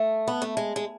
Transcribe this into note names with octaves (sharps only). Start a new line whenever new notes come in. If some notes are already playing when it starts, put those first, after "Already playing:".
Already playing: A3
B3
A3
G#3
G#3